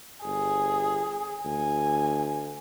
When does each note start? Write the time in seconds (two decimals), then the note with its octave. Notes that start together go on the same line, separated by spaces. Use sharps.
0.25 G1 G#4
1.45 D2 G#5